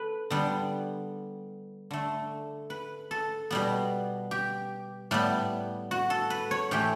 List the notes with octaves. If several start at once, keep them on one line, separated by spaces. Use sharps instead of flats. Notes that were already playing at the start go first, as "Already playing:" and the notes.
Already playing: A4 B4
D3 G3 B3
D3 A3
B4
A4
B2 G3 B3
G4
A2 G3 B3
F#4
A4
B4
C#5
A2 E3 A3 G4